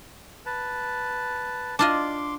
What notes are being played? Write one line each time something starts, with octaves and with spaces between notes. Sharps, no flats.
B4 A5
D4 F4 D#5 C6 D6